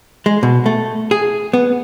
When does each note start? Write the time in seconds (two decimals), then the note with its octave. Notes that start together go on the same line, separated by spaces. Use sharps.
0.26 G#3
0.43 B2
0.66 A3
1.11 G#4
1.54 B3